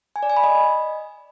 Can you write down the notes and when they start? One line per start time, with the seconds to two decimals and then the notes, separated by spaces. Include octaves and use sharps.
0.16 G#5
0.23 D5
0.30 G#5
0.37 B5
0.44 D#5